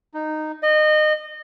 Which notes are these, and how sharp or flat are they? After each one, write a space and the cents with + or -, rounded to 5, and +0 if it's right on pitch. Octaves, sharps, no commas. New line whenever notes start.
D#4 -10
D#5 -25